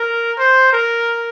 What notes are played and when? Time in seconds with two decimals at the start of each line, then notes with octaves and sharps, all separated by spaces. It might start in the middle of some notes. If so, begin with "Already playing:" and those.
Already playing: A#4
0.39 C5
0.73 A#4